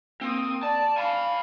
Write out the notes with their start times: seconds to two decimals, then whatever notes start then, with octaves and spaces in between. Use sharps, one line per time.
0.21 A#3 C4 D#6
0.63 D5 A5
0.98 F5 G#5 B5